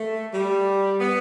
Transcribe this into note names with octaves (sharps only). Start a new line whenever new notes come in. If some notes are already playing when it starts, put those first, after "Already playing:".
Already playing: A3
G3
B3